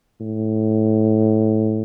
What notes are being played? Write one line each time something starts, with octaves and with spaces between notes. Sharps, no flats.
A2